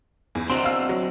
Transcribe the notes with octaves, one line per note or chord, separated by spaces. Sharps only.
E2
C4 D4 F#4 C6
F5 E6
F#3